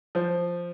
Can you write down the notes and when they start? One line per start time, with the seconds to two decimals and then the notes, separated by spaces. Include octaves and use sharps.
0.15 F3 C5